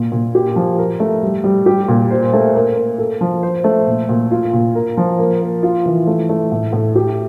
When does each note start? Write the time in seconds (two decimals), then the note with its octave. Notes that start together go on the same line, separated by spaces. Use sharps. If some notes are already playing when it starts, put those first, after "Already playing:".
Already playing: A#2
0.12 A#2
0.35 G4
0.56 F3
0.78 A#4
1.00 A3
1.23 G3
1.44 G3
1.66 G4
1.88 A#2
2.10 C5
2.33 A3
2.55 A#3
2.76 A#3
2.98 A4
3.21 F3
3.43 C5
3.64 A3
3.87 A#2
4.09 A#2
4.31 F4
4.53 A#2
4.75 A#4
4.97 F3
5.19 A#3
5.41 A#3
5.63 F4
5.86 E3
6.07 A3
6.29 A3
6.51 A2
6.72 A2
6.95 G4